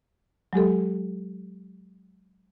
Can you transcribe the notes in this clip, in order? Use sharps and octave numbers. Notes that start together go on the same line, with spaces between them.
F#3 G#3 G4 A4